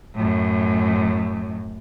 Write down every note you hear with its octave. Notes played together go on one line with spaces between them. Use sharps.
F#2 A2